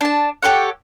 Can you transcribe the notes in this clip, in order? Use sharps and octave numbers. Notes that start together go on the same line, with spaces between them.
D4 A5
G4 A4 C#5 F#5